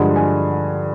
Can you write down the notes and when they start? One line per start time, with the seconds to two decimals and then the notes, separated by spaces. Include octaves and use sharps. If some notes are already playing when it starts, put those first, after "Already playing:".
Already playing: G2 D3 F3 G#3 F#5
0.16 G#5